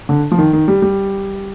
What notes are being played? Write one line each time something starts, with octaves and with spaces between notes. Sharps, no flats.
D3
F3
D#3
D#3
G3
G3